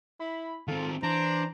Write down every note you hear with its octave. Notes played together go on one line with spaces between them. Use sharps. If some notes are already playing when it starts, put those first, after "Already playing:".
E4 B5
D#3 C4 F4 A4
E3 D4 C5 A#5